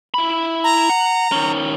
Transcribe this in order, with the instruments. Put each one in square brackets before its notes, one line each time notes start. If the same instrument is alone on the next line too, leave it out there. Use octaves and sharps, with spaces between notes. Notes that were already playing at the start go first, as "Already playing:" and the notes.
[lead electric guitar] E4 B5
[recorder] A#5
[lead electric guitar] F#5
D#3 C#4